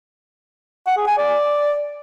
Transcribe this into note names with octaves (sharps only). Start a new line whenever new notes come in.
F#5
G#4
G#5
D5